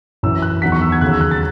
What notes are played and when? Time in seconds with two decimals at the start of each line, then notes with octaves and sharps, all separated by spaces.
0.23 F#2 E3 E6
0.42 F#6
0.62 E2 D#3 F#3 B6
0.72 C#6
0.82 E6
0.92 G#6
1.01 D#2 C#3 F#3 F#6
1.11 E6
1.21 F#6
1.31 A6